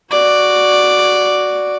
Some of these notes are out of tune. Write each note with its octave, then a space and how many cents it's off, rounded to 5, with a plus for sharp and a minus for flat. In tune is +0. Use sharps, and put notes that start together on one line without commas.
F#4 +0 D5 +0